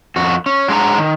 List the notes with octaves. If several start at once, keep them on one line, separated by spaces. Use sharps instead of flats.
F2 F#4
C#4
F#3 G#3 D4 F#5 A#5
D#3